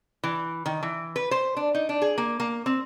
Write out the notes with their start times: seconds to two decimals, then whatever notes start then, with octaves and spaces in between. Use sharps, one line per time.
0.24 E3
0.66 D#3
0.83 E3
1.16 B4
1.31 C5
1.56 D4
1.75 D#4
1.89 D4
2.02 G#4
2.18 A#3
2.40 A#3
2.66 C4